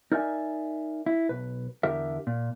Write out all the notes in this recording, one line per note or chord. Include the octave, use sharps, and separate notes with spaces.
D#4 A#4 D5 E5 G5 G#5
E4
B1 B4
E2 D3 G4 A#4 E5
A#2